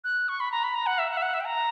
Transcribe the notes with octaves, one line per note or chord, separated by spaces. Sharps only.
F#6
C#6
B5
A#5
B5
A#5
F#5
E5
F#5
E5
F#5
E5
G5
A#5